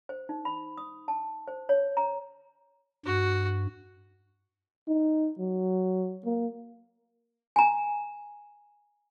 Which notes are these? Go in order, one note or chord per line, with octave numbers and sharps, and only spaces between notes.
C5
D#4
B5
D#6
A5
C5
C#5
A#5
G2 F#4
D#4
F#3
A#3
G#5 A#5